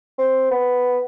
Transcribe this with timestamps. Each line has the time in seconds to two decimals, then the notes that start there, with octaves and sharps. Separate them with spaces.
0.19 C4
0.51 B3